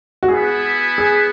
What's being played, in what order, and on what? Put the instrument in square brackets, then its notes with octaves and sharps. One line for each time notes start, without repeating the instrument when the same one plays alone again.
[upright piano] F#4
[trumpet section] B3 E4 B4 E5 [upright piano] G#4
[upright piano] G#4